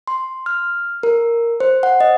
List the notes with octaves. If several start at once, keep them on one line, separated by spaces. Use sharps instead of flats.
C6
F6
A#4
C5
F#5
D#5